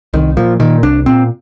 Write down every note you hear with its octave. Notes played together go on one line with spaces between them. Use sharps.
C2 D#3
A#2 F3
A#2 D#3
C2 D4
A#2 C4